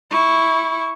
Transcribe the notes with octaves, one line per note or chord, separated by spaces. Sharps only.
E4 C#6